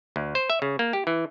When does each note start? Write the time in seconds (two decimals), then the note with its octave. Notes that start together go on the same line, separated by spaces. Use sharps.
0.16 D2
0.35 C5
0.50 E5
0.62 C#3
0.79 A#3
0.93 G4
1.07 E3